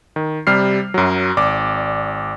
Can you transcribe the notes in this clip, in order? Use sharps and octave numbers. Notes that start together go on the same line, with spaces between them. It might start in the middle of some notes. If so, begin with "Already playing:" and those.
D#3
C3 G3 F6 C7
F#2 F#3
G#1 D5 D6